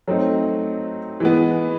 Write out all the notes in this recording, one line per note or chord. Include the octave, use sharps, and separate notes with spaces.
F#3 A3 C4 D#4
E3 G#3 B3